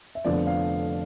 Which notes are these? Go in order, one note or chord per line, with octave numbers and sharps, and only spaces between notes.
E5
F1 F2 D3 F3 B3 D5
F5